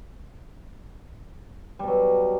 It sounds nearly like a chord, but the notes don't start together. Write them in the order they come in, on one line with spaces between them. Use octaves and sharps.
G3 B2 F#3